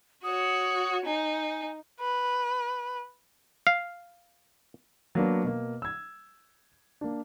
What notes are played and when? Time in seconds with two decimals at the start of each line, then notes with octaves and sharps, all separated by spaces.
0.24 F#4 C#5 D#6
1.06 D#4 G#5
2.00 B4
3.67 F5
5.15 F#3 A#3 B3 D4
5.44 B2 A#3
5.82 E6 G#6
7.01 A#3 D4